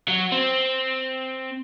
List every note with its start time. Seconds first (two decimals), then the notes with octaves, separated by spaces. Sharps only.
0.08 F#3
0.32 C4